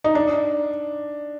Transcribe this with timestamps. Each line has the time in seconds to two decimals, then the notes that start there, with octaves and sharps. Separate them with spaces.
0.04 D#4
0.15 D4